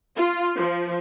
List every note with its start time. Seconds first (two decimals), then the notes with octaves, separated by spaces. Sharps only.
0.16 F4
0.56 F3